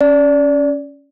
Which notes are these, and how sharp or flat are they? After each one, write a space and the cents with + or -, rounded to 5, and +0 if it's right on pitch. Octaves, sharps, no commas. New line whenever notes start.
C#4 +10 D5 -15